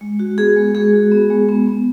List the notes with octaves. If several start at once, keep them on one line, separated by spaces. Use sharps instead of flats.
G#3
F#4
B3 G#4
G#3
G#3 G#4
F#4
B3
G#3
B3
B3